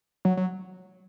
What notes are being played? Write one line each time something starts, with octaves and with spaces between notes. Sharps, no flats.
F#3
F#3